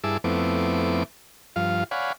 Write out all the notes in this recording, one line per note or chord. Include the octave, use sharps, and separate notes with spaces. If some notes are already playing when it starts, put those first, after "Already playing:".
G2 E4 G#4 A5 D6 E6
F2 A3 B3 C4 E4 D6
G2 F3 F4 F5
C#5 D5 F5 F#5 G#5 B5